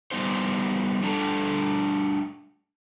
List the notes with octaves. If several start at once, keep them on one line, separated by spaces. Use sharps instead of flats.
G3 B3 D#4 C5
G3 A3 D4 A4 A#5